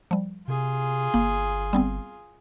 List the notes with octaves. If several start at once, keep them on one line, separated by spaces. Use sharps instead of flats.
F3 G3
C3 F4 G#4
G1 A#3
G3 B3 C4